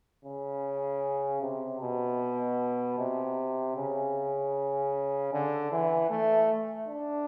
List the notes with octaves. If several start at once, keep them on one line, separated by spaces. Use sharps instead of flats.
C#3
C3
B2
C3
C#3
D3
E3
A3
D4